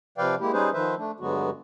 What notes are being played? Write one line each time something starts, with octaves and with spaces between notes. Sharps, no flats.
C3 F3 B4 D5 F5 G5
G#3 A#3 E4 G4
G3 C#4 D#4 G#4 B4 C5
D#3 F3 B4 C5 E5
A3 D4
G2 D3 F#3 G#3 B3 F#4